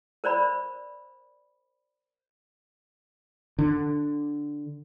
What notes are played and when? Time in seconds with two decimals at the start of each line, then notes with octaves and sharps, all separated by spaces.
0.24 A#4 C5 D5 B5
3.59 D3